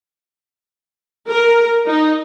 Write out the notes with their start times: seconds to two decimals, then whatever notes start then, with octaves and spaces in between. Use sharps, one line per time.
1.28 A#4
1.87 D#4